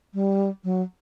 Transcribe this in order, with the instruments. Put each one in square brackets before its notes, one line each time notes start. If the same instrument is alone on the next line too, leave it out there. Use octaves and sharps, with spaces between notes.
[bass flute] G3
F#3